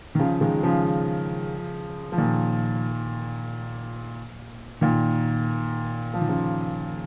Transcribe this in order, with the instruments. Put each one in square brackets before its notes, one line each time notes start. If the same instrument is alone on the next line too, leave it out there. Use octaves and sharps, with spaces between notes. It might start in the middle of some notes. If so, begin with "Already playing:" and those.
[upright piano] D#3
C#3 F3
D#3 G#3
C#3 F3
F3
A#2 D#3
A#2 D#3
F3
D#3
C#3 F3